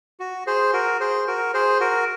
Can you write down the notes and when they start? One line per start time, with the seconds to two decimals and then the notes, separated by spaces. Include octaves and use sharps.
0.20 F#4
0.47 G#4 C5
0.73 F#4 A#4
1.00 G#4 C5
1.27 F#4 A#4
1.54 G#4 C5
1.80 F#4 A#4